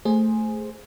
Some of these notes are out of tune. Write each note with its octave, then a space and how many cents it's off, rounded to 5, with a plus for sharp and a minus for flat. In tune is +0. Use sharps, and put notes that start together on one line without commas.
A3 +0 G#4 +0 C5 +0